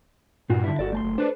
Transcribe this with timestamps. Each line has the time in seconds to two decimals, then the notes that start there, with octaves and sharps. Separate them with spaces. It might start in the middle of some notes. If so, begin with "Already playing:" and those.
0.50 G2 A#2 F4 F#4
0.64 D3 E4
0.79 G1 F#4 A4 D5
0.93 A3 A5 C6
1.04 F#1
1.18 D4 A4 B4 C5